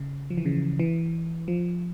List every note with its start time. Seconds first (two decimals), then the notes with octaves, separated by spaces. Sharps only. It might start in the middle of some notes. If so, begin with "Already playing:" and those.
Already playing: C#3
0.30 F3
0.38 E3
0.45 C#3
0.79 E3
1.48 F3